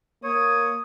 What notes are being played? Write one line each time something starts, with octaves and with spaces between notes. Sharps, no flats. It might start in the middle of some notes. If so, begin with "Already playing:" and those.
A#3 C#5 D#6